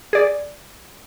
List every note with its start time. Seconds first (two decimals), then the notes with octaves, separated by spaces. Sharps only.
0.13 G#4 D5